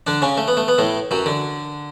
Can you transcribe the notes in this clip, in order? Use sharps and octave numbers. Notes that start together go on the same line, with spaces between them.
D3 D4
C#3 C#4
A3
B3
A3
B3
A2 A3
F#2 F#3
D3